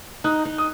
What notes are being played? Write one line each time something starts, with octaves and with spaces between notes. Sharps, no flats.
D#4 D#6 F#6
D#4
D#6